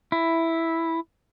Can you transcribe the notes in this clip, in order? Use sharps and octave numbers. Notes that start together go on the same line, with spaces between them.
E4